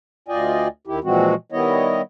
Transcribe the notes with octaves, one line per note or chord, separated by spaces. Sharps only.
D2 F4 D5 D#5 G5 G#5
D#2 D#3 E4 G4
A#2 E3 F3 G#3 C4 F#4
D#3 G3 B3 E4 C#5 D#5